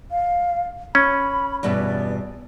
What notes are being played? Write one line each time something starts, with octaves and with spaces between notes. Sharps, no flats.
F5
C#4 B5
E2 G2 B2 D5